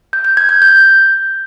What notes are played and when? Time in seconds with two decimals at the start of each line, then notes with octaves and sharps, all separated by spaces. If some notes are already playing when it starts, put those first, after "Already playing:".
0.13 G6
0.25 G6
0.37 G#6
0.49 G6
0.62 G6